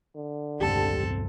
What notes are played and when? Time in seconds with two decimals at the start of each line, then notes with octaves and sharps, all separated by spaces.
0.16 D3
0.61 E1 C#2 G2 C4 G4 A4 A5